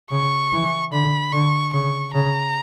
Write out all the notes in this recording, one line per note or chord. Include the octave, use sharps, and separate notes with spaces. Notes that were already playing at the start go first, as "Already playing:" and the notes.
C#3 C#6
E3
D3 B5
D3 C#6
C#3 C#6
C#3 A#5